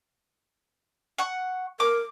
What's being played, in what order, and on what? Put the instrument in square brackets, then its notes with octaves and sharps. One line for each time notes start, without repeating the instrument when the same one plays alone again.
[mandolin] F#5 C#6
[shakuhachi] A#4 [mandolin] D6